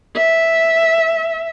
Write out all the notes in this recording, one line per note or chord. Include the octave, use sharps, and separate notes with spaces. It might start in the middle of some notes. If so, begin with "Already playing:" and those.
E5